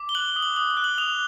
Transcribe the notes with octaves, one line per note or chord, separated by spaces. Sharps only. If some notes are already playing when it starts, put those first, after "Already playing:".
Already playing: D6
G7
F#6 F#7
D#6
F#7
D#6 F#7
F#7
F#6
F#7
D#6 F7